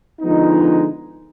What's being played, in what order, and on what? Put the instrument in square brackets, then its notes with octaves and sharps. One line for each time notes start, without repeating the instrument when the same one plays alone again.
[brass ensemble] D3 F3 G#3 B3 D#4